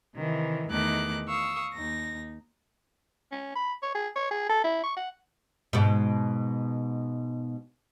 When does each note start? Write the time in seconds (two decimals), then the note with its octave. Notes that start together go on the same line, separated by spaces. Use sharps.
0.15 C3 D#3 E3
0.70 E2 D#3 A3 D#4 D6 F#6
1.27 F5 C#6 D#6 E6
1.74 D#2 D#4 A#6
3.32 C#4
3.55 B5
3.82 C#5
3.95 G#4
4.16 C#5
4.31 G#4
4.49 A4
4.64 E4
4.84 C#6
4.97 F#5
5.73 G#2 B2